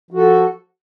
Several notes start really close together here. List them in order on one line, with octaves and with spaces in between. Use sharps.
F3 F#4 A4